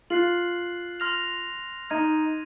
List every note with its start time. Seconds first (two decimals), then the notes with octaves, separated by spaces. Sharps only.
0.10 F4 F#6 C7 F#7
1.00 C6 F6 A#6 F7
1.90 D#4 F6 G#6 D#7